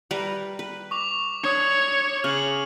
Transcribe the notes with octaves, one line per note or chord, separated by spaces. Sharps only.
G3 A#4 B4
B4
C#6 D6 F7
D4 C#5 D#6 C#7
C#3 F6 F#7